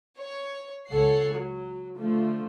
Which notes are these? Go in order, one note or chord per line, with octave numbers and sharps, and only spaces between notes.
C#5
C#2 A4 C#5 F#5 C7
F#3
D3 F3 A3